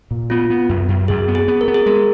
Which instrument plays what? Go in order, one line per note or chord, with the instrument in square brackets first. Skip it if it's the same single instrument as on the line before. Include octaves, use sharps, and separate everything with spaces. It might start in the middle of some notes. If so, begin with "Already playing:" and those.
[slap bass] A#2
[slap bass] B3 [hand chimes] F4
[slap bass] B3
F#2
F#2
[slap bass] F#2 [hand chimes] G#4
[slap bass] B3
[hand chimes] G#4
[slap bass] B3
[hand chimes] A#4
[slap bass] B3
[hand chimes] G#4
[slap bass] G#3 [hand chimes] A#4